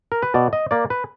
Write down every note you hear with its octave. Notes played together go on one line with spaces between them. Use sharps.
A#4
B4
B2 D5
D#5
A#3 D5
B4